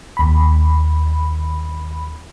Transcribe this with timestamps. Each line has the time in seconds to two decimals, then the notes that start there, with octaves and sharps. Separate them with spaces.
0.17 D#2 B5